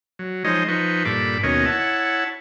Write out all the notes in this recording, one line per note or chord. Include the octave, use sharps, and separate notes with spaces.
F#3
F3 G#3 D#4 C5 C#5 D#5
F3 D#4 B4 C5 C#6
G2 A#2 A4 B5 D6
D#2 B2 C#4 A#4 C#5 D#5
E4 C#5 F#5 A5